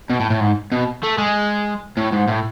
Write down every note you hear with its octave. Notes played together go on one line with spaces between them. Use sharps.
B2
A2
A2
G#2
B2
A3
G#3
A2
G#2
A2